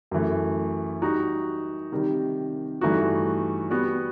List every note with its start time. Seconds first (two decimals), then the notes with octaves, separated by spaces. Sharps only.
0.11 F#2 E3 A3
1.02 G3 D#4 F#4
1.92 C3 D#3 G3
2.81 G2 E3 A3 D#4 F#4
3.70 G3 B3 F#4